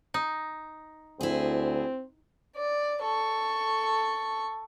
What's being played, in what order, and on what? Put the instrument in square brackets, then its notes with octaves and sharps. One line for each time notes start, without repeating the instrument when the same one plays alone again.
[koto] D#4
[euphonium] D2 [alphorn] C4 [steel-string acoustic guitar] E4 G#4
[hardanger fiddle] D5
A4 C#6